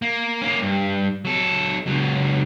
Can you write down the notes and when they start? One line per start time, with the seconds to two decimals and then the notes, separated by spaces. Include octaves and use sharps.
0.02 A#3
0.42 A#3 C#4
0.62 G2
1.25 F#3 A4
1.87 C#2 F#3